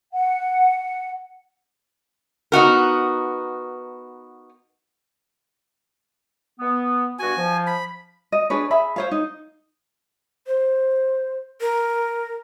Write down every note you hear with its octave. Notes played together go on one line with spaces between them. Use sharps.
F#5
B3 D#4 F#4 A#4
B3
G2 B3 F#4 G#5
F3
B5
D#5
D4 G#4 B4 C#5
G#4 E5 B5
C5 C#5 F5
D#4
C5
A#4